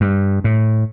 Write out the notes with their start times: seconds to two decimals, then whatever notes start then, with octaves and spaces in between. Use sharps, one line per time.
0.01 G2
0.44 A2